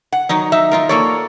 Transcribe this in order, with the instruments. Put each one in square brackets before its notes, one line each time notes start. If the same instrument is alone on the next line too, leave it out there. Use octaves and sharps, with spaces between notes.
[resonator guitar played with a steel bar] F#5
[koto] D#3 F#3 D#4
[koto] D#4 [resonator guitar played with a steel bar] E5
[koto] D#4 F4 A#4
[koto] A#3 A4 D5 [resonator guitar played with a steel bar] C#5